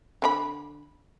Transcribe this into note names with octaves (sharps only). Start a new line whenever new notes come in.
D3 C#4 B5